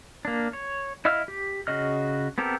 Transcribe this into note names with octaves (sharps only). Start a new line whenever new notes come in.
A#3 D4
C#5
E4 D#5 F5 E6 F6
G4
C#3 F#4 D#5 F6
B3 C4 G4 A4 A#4